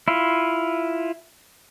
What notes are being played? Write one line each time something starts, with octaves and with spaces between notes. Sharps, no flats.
E4 F4